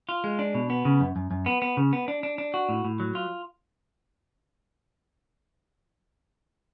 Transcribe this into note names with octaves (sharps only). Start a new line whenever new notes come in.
F4
G#3
D4
B2
B3
C#3
F#2
F#2
F#2
B3
B3
C#3
B3
D4
D4
D4
F#4
A2
A2
F#3
F4